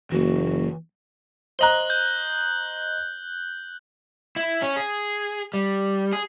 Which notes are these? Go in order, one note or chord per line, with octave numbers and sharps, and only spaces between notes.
F#1 E3 A#3 F#4
C5 D#5 A#5 F#6 F#7 G7
G6
E4
C#4
G#4
G3
G#4